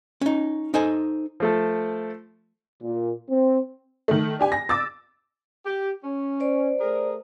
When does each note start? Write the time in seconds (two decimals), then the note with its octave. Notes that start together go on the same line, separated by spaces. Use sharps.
0.21 C#4 D#4
0.74 D#4 A4 C5 D#5 G#5
1.40 F3 A3 A4
2.82 A#2
3.29 C4
4.08 D#3 A3
4.39 D4 G4 G#5
4.52 A#6
4.69 D6 E6 A6
5.66 G4
6.04 C#4
6.40 C5 D5
6.80 A3 G#4 A#4